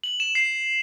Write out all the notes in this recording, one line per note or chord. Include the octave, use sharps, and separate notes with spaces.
F#7
E7
C7